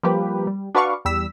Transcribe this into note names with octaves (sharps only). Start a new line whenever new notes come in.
F3 G3 A#3 G4 B4
G3
D4 F#4 B4 D5 F5 C#6
E2 G3 E6 B6